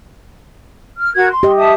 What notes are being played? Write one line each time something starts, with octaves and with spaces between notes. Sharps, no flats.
F6
F#4 A#4 G#6
C6
G4 D#5
E5 A5 D#6